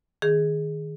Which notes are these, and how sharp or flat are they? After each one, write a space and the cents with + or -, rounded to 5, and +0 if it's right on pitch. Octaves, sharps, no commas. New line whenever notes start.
D#3 +0 G#4 +0